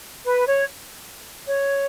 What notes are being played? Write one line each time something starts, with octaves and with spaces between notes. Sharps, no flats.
B4
C#5
C#5